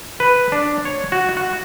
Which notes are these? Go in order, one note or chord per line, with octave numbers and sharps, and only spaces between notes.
B4
D4
C#5
F#4
F#4